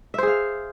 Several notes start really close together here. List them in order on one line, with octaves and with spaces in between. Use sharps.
E5 C5 G#4 F5